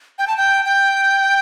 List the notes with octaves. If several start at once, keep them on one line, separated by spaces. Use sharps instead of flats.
G5
A5
G5
G5